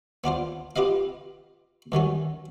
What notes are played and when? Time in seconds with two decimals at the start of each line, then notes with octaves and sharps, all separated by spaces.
0.24 B3 D4 F4 C5
0.76 F4 G4 B4 D#5 F5
1.92 G2 D#3 F#3 C#4